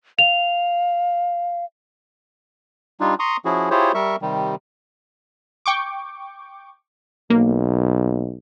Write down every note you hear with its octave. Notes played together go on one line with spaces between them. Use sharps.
F5 F7
G3 D4 D#4 F4
A#5 C6 C#6 D#6
F3 C#4 E4 F#4 G#4
E4 F4 G4 G#4 C5 C#5
G3 A#4 E5 C#6
C3 D#3 G3
G5 C#6 D6
B1 A#3